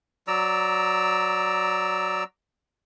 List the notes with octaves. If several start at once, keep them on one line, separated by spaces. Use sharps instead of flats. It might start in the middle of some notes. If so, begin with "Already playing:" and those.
F#3 D5 A#5 E6